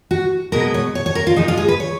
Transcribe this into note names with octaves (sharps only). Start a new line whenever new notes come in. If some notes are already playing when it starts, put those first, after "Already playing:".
F#4
B2 G#3 B3 A#4
C#5
C#5
C#5
A#4
F4
G#2 F3 G#3 D#4
F4
G#4
B4
C#5